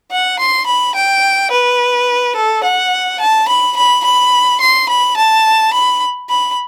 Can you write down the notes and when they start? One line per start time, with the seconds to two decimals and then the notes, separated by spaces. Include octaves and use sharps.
0.12 F#5
0.39 C6
0.67 B5
0.95 G5
1.51 B4
2.36 A4
2.64 F#5
3.20 A5
3.48 B5
3.77 B5
4.04 B5
4.61 C6
4.89 B5
5.17 A5
5.74 B5
6.30 B5